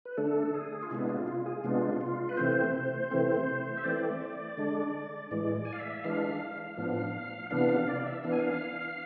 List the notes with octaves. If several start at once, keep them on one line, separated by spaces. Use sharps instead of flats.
B4
D3 A3 D4 A4
G#4
F4
C3 G#3 B3 D4 E4
F4
F4
G#4
C3 G#3 B3 D4 F4
F4
B4
C3 E3 A3 C4 C5
C3 E3 A3 C4
E5
E3 A3 C4 D5
D3 G#3 D4
A2 E3 G#3 D5
D5
G#5
F5
E5
E3 G#3 D4 F5
A2 F3 B3 D4
C3 E3 B3 D4 F5
F5
D5
E5
E3 B3 D4 F5
G#5
F5